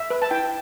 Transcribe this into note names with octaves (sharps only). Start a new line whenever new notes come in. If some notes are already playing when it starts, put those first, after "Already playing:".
Already playing: E5
B4
A5
E4 G5